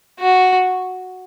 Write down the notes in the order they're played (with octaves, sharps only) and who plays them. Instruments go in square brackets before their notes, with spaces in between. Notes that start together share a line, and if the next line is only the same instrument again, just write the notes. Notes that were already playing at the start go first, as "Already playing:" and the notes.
[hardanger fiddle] F#4